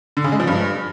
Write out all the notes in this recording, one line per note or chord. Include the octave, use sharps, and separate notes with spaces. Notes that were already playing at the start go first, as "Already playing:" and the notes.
D3
C#3
G#3
F3
G2